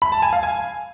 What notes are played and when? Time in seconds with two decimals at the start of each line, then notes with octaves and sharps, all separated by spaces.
0.02 B5
0.12 A5
0.22 G#5
0.33 F5
0.43 G#5